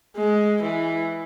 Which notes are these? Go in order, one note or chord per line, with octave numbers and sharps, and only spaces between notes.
G#3
E3